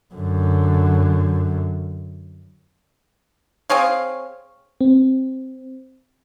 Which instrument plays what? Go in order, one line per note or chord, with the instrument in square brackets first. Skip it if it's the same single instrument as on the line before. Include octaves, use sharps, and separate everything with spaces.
[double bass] F#2 D3
[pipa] C4 G#4 C#5 F5
[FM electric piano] C4